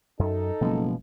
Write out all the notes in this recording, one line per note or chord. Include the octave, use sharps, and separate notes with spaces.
F#2 D#4 A4
F#1 B2 F3 G#3